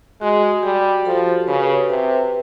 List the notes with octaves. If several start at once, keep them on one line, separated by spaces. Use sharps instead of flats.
G#3 F#4
G3 G4
F3 A4
C#3 B4
C3 B4
B4